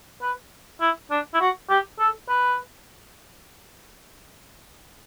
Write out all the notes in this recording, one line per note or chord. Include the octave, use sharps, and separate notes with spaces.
B4
E4
D4
E4
F#4
G4
A4
B4